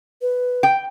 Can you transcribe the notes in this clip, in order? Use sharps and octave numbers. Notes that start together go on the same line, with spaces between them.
B4
G5